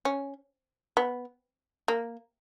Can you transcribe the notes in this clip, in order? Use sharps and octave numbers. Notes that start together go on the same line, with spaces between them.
C#4
B3
A#3